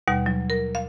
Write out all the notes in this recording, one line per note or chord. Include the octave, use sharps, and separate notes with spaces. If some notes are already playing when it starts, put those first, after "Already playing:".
D#2 B2 G3 F#5
F#3
A#4
F5